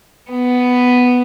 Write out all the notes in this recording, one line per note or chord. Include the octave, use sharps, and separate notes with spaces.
B3